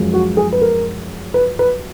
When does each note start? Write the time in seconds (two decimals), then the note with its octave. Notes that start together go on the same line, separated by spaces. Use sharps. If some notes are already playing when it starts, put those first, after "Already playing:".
Already playing: F#2 F3 G#3
0.13 F#4
0.37 G#4
0.52 B4
0.61 A#4
1.34 B4
1.59 B4